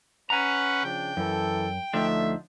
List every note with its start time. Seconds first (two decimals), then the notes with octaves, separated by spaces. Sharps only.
0.30 C#4 B4 F#5 G#5 A#5
0.83 C#3 F3 D4 G5
1.17 F#2 E3 A4
1.94 D2 F3 A3 D4 D#4 E5